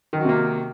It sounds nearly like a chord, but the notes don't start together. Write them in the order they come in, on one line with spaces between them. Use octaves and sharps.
D#3 F#3 F#4 C3 A#3